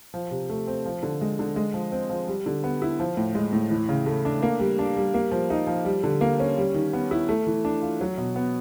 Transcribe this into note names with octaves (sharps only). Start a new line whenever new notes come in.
F3
C3
A3
C4
F3
D3
G#3
D3
G#3
F3
C4
F3
G3
D3
B3
E4
F3
A2
G#3
A2
E3
C#3
A3
D4
A#3
G3
D4
G3
A#3
F3
D#4
F3
G3
D3
A#3
C#4
G3
D#3
B3
E4
A3
E3
D4
F4
F#3
B2
B3